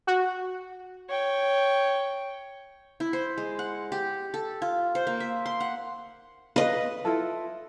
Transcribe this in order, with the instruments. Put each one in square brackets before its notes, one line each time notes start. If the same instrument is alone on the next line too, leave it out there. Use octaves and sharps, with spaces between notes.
[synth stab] F#4
[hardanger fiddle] C#5 G5
[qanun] E4
C5
G#3
F#5
G4
A4
F4
C5
A#3
E5
C6
F#5
[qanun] B4 D#5 [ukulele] F5
[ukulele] E4 F4 A4